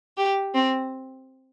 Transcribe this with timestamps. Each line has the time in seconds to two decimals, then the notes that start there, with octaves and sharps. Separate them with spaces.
0.17 G4
0.54 C4